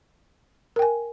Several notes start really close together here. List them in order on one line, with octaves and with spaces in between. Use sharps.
A#4 G5 G#5